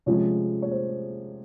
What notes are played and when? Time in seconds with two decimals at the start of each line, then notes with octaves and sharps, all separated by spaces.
0.06 C3 F3 G#3 C#4 C#5
0.62 C#5
0.71 C5